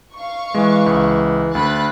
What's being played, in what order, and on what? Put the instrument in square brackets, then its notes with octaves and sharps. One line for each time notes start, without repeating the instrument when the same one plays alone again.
[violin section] F5 C#6
[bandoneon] E3 [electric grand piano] G#3
[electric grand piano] C#2
[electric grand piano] D2 [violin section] B5 F#6 A6